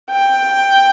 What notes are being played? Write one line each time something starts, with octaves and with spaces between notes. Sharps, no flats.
G5